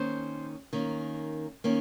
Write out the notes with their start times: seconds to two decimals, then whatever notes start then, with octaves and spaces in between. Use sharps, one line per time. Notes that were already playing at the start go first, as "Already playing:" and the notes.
Already playing: D#3 A#3 C#4 C5
0.73 D#3 A#3 C#4
1.64 D#3 A#3 C#4